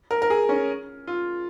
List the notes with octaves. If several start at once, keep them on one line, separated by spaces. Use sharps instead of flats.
A#4
A#4
G#4
C#4
F4